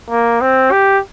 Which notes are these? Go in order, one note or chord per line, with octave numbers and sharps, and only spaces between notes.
A#3
C4
G4